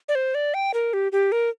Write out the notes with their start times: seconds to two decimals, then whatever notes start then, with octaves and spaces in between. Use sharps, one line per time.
0.09 D5
0.15 C5
0.35 D5
0.54 G5
0.74 A#4
0.93 G4
1.12 G4
1.32 A#4